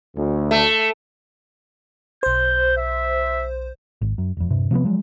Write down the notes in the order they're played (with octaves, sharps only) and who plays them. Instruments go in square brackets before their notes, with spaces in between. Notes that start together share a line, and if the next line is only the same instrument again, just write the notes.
[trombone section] D2
[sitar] A3
[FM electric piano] B1 C5 [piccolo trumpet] G6
[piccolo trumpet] E5
[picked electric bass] G#1
F#2
E1 F2
D#1 G2 C3
C3 F3 G#3 B3
F3 F#3 G#3